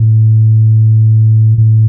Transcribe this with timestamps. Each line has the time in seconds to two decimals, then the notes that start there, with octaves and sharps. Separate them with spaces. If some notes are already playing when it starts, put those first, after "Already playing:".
Already playing: A2
1.58 A2